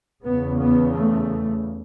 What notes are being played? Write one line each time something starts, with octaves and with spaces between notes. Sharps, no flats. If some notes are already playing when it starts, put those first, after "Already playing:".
E2 C#3 B3
B3
A3